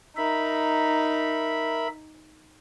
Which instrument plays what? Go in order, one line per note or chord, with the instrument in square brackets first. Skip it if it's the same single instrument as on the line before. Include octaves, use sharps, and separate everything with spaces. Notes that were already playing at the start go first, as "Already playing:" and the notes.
[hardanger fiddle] D#4 [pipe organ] A#4 E5 B5